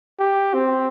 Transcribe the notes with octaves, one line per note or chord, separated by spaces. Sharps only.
G4
C4